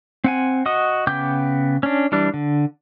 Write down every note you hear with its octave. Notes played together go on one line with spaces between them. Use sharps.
C4 F#5 G#5
F#4 D#5 F#5 D#6
C#3 B3 G5 D6 G6
C#4 D4
E3 G3 D4
D3